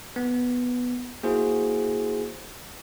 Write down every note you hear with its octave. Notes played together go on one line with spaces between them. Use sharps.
B3
A#3 E4 F#4 G#4 C5